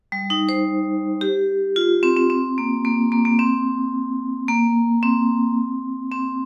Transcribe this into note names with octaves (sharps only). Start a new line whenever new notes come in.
G3
D#4
C5
G4
F4
C4
C4
C4
A#3
A#3
A#3
A#3
C4
A#3
C4
C4